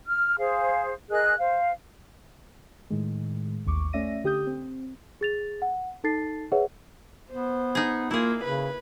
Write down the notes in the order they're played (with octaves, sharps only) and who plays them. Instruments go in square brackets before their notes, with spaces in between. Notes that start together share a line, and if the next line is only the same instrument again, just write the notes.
[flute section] F6
G#4 C5 F5
G#4 A#4 D#5 F#6
C5 F5
[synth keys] A2 D#3 G#3
A1 D#2 C#6 D6
A3 C#4 D5 E5 A#6 D#7
D3 G4 D#6 G6
C4
[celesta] G#4 A6 F7
F#5
D#4 A4 A5 A6 C7
G#4 B4 C#5 E5 F#5
[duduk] B3 [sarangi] C5
[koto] D#4 G#4
[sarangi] A#3 [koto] E4 G#4 [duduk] F4
[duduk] C#3 [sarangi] B4